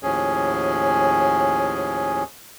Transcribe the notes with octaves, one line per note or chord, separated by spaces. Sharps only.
D#2 A2 F3 C#4 G#4